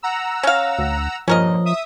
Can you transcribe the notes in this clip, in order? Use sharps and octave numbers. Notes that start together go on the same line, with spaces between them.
F#5 A#5 E6
C#4 F5
D2
G2 A#2 F3 C#4 A#4 D#5
E5 D#6